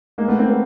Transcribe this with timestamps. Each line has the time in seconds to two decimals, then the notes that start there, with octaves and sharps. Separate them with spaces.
0.18 G#3 A#3
0.28 A3 B3
0.39 A#3 C4
0.50 B3